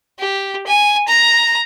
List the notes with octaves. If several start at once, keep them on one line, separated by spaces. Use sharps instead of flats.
G4
G#5
A#5